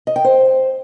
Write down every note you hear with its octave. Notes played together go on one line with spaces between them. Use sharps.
D#5
G5
C5